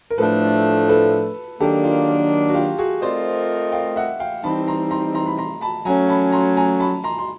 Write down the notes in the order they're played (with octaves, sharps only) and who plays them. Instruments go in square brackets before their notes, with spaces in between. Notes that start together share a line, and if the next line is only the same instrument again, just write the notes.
[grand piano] A#4
[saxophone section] A2 F3 A3 D4 [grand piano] A4 B4
[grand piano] A4 B4
[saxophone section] D#3 F#3 A#3 D4 [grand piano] G4 A4
[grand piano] F4
F#4
F4 G4
F#4 G#4
[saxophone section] A3 C4 F4 A#4 D#5 [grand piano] C5 D5
[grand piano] F5 G5
E5 F#5
F5 G5
[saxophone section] E3 G3 C4 D#4 [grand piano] A5 B5
[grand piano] A#5 C6
A#5 C6
A#5 C6
B5
A#5 C6
A5 B5
[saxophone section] F#3 A3 C#4 [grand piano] G#5 A#5
[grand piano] A5 B5
A#5 C6
G#5 A#5
A5 B5
A#5 C6
C6